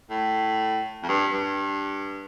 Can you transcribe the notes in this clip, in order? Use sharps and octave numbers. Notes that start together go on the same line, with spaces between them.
A2
F2
G2
G2